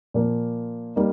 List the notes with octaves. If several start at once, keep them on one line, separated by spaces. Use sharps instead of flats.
A#2 F3 A#3
G3 A#3 D#4